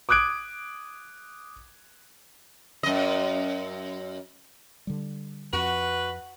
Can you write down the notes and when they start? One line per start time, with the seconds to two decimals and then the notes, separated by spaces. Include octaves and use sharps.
0.09 D6 D#6 F#6 G#6 D7
2.83 F#2 D#5
4.87 D3 G3
5.53 F2 F#4 B4